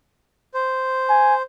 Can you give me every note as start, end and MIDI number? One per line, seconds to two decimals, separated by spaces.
0.54 1.42 72
1.09 1.35 80